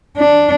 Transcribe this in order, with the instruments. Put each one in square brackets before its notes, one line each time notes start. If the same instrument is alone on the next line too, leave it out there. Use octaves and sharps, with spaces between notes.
[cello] D4